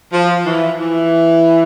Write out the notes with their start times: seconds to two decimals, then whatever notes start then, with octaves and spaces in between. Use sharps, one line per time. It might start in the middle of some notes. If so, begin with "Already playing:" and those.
0.13 F3
0.46 E3
0.79 E3